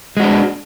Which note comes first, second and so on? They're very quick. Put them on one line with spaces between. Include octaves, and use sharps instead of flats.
G#3 F#4 D4